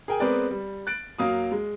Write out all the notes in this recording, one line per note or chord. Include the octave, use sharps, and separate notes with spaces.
G#4 A#4 G5 G#5
G#3 B3 C4 A#4 B4 D5
G3
F#6 A6 D7
F#2 F#3 A#3 F5 D#6
G#3